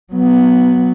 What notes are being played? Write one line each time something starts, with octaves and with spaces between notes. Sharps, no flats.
F#3 B3